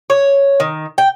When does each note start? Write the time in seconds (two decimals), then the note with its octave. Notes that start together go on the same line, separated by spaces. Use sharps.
0.10 C#5
0.60 D#3
0.98 G5